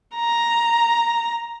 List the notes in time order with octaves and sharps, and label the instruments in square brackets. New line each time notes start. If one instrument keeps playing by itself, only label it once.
[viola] A#5